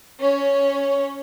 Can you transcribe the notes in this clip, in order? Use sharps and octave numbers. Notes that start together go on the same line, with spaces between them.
C#4 C#5